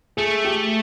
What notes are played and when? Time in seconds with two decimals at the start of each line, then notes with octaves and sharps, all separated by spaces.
0.17 A3 G#4
0.44 G4